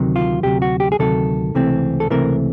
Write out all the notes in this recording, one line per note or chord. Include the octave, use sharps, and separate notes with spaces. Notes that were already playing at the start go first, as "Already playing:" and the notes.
Already playing: D2 C3 D#3 F#3
F4
D2 C3 D#3 F#3 G4
F#4
G4
G#4
D2 C3 D#3 F#3 A4
C#2 C3 E3 A3 C4
A4
C#2 C3 E3 A3 C4 A#4